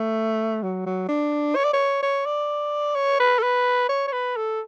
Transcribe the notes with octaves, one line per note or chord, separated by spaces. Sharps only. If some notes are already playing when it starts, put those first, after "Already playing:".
Already playing: A3
F#3
F#3
D4
C#5
D5
C#5
C#5
D5
C#5
B4
A4
B4
C#5
C#5
B4
A4